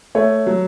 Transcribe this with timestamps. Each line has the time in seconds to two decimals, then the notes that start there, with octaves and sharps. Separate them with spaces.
0.15 A3 C#5
0.47 F#3